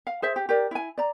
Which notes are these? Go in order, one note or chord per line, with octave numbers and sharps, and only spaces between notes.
F5
G#4 C5 E5
G4
G4 A#4 D5
E4 G#5
D5 A#5